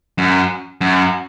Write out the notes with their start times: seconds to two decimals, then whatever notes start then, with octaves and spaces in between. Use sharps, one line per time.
0.18 F#2
0.81 F#2